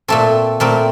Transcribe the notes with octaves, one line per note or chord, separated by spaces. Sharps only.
A#2 A3 C4 A4
A#2 A3 C4 A#4